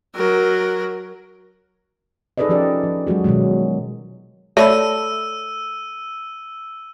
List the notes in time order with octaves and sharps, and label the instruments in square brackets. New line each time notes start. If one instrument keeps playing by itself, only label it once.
[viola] F#3 A#4
[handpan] D#4 G#4 A4 B4 D5 D#5
F3 C#4 G4 D5
F3
F#3 G#3 F#4 G#4
B2 D#3 F#3 G#3
[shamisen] A3 [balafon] C#5 [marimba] D5 A5 B5 [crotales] E6 D#7